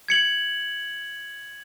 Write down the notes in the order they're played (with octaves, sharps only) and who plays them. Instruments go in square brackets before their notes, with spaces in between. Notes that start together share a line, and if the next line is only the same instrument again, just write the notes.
[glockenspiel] G#6 C#7 F#7